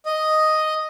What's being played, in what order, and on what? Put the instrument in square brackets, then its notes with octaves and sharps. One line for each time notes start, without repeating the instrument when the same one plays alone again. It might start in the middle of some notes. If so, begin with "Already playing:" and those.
[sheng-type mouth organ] D#5